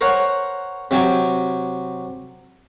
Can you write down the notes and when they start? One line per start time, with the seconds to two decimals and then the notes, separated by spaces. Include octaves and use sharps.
0.01 A#4 C5 C#5 F#5
0.91 C3 F#3 G5 G#5